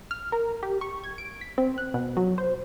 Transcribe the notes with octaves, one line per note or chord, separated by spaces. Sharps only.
F6
A#4
G4
C#6
G#6
D7
B6
C4
F#6
B2
F#3
C5